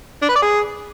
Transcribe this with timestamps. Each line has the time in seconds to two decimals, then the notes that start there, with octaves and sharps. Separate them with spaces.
0.22 D4
0.29 B4
0.36 D5
0.42 G#4